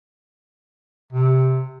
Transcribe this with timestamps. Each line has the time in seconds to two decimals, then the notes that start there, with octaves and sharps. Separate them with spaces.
1.13 C3